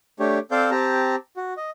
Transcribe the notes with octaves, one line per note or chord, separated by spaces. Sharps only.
A3 D4 G4 C#5
C4 A4 C5 D5 F5 G6
C4 G4 A5 A#5
F#4
D#5